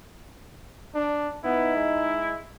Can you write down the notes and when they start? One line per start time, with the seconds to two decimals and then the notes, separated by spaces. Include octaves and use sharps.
0.94 D4
1.44 B3 D#4 E4
1.75 G#3